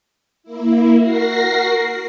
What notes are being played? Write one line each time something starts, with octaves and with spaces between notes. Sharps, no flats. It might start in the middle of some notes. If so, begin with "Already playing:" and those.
A#3 E4
F#4 A#4 A#6 C7